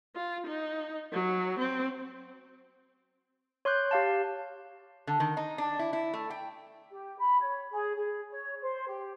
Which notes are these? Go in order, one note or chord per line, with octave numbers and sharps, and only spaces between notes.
F4
D#4
F#3
C4
C#5 C6 D6 F#6 G6
G4 F5 A5
D3
D#3
D#4
D4
E4
E4
A3
G5
G4
B5
C#5
G#4
G#4
C#5
C5
G4